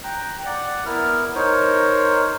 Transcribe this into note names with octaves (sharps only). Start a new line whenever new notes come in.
G5 A#5 F#6
D5 F#5
B3 E4 A#4 F6
D#4 A#4 C5 C#5